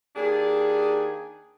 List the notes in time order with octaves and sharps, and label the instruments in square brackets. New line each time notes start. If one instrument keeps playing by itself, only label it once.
[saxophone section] D#2 D4 G#4